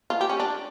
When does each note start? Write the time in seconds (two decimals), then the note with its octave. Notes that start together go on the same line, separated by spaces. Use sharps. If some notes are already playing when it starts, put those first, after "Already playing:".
0.10 F4
0.21 G4
0.29 C#4
0.40 D4